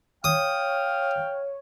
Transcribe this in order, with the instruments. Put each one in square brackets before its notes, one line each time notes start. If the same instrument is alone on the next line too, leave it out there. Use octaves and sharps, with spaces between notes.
[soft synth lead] C#5 [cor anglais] F5 [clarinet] G5 [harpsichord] D#6